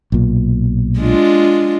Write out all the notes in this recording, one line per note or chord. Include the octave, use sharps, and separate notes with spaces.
B1 A#2
G#3 D4 F4